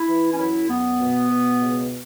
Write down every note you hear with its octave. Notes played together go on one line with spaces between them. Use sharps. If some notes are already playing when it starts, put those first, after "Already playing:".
Already playing: E4
E3
C#4
F#2 E4
F#2 B3
B2
B2
C#2